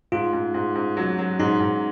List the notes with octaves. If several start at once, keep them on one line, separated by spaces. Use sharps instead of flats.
G#2 F4
G#2
G#2
G#2
F#3
F#3
G#2 D#4
G#2